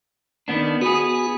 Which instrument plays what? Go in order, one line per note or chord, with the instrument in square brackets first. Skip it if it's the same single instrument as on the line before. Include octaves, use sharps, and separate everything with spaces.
[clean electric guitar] D#3 B3 D4
[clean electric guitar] B3 G#4 [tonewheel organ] F#4